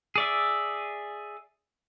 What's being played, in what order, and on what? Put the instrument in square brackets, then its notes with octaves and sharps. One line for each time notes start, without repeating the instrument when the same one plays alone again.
[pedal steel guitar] G#4 D5 E5